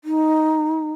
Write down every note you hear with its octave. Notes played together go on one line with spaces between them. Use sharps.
D#4